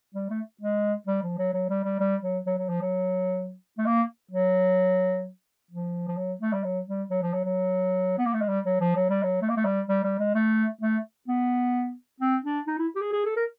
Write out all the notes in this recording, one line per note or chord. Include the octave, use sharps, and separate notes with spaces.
G3
A3
G#3
G3
F3
F#3
F#3
G3
G3
G3
F#3
F#3
F#3
F3
F#3
A3
A#3
F#3
F3
F3
F#3
A3
G3
F#3
G3
F#3
F3
F#3
F#3
B3
A#3
A3
G#3
G3
F#3
F3
F#3
G3
F#3
A3
A#3
A3
G3
G3
G3
G#3
A3
A3
B3
C4
D4
D#4
E4
G4
G#4
G#4
A4
A#4